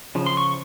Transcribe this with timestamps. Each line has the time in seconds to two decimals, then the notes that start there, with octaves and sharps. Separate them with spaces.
0.15 C#3 F3
0.26 C6
0.37 C#6